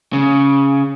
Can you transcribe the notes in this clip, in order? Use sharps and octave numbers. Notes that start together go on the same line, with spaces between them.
C#3